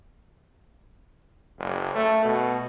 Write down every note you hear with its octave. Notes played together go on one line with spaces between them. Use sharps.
F#1
A3
B2